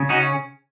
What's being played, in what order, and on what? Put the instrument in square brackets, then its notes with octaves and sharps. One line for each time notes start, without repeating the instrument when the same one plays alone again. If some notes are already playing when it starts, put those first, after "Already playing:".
Already playing: [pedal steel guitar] C#3
C#4 D#4 F#4